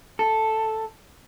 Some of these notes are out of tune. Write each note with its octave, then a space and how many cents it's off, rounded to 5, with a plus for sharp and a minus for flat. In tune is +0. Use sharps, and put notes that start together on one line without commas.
A4 +0